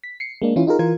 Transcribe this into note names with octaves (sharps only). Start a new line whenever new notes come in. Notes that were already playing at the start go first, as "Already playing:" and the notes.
B6
C7 C#7
G#3 A#3 D4
E3 C#4 E4 F4
D#4 F4 G#4 A#4
E3 F4 A#4 G#6